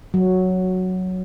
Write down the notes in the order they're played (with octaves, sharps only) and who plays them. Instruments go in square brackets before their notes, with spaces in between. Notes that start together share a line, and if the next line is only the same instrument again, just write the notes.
[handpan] F#3